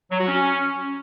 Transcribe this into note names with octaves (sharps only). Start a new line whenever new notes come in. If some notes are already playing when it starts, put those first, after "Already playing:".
F#3
F#4
C#4